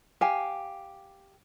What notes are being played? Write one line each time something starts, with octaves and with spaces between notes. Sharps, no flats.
G4 F5 G#5